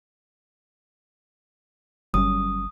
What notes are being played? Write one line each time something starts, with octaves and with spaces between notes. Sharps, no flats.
G1 F#3 G3 C#4 D#6